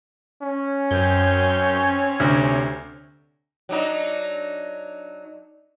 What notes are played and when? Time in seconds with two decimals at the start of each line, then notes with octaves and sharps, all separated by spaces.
0.42 C#4
0.91 F#2 C4 C#5 G#5 G6
2.20 D2 C3
3.69 F#3 D4 D#4